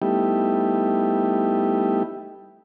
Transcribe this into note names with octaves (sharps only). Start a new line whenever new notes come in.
G3 A3 B3 D#4 E4 G4